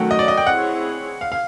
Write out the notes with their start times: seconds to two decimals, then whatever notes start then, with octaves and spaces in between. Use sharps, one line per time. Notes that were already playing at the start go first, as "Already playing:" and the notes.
Already playing: D#3 F#3 A3 C#4 F#4 F#5 G5
0.11 D#5
0.19 D5
0.28 D#5
0.37 G5
0.46 C4 E4 G#4 C#5 F#5
1.21 F5
1.32 F5